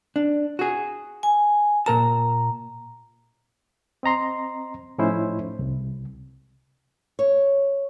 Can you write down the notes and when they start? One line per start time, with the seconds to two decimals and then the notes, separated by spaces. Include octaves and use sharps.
0.16 D4
0.59 F#4 G#4
1.23 G#5
1.86 A#2 A#4 A5 A#5
4.03 C4 D#5 A#5 C6
4.98 A2 F3 C#4 D#4 E4 C5
5.59 C2
7.19 C#5